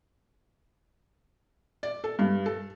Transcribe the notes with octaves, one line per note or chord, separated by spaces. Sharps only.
D5
A4
G2
A4